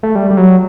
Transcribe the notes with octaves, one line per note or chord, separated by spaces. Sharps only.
A3
G3
G3
F#3